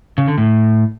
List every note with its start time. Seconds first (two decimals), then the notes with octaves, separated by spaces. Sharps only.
0.18 C#3
0.28 D3
0.38 A2